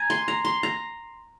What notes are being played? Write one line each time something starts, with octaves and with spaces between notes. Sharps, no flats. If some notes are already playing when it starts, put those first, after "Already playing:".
Already playing: G#5 A#5
C6
A#5
C6
A#5